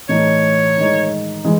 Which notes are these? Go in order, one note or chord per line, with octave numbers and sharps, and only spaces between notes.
A2 E3 A3 D#4 C#5
D#3 G#3 D#4
E3 G#3